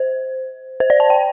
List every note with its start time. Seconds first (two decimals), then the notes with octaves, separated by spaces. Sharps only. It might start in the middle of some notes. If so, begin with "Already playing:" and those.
Already playing: C5
0.80 C5
0.90 D5
1.00 A5
1.10 G5